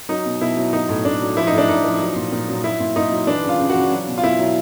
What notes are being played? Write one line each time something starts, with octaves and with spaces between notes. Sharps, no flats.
F#3 D#4
B2
B2 E4
F#3
F#3 D#4
A2
A2 D4
F#3
F3 E4
D#4
A2
D4
A2 D#4
F3
F#3
A#2
A#2
F#3
F#3 E4
A#2
A#2 D#4
F#3
E3 D4
C#3
F4
C#3
F#4
E3
F#3
B2
F4
B2 E4
F#3